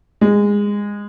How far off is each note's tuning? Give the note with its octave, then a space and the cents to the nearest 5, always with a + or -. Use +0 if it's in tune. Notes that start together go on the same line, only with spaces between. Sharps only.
G#3 -20